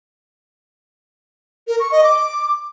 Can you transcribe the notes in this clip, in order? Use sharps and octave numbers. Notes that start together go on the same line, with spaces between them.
A#4
C#6
D#5
D6